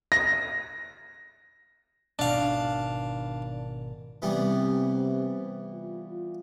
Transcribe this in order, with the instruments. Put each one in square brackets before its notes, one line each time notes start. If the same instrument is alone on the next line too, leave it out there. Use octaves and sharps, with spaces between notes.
[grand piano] A#6
[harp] G#1 B2 [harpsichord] D4 F5
[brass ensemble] C3 [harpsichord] E3 G3 B3
[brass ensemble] F4